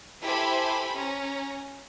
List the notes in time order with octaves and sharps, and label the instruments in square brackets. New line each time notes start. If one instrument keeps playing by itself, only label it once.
[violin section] E4 G4 A4 C5 G#5 B5
C#4 A#5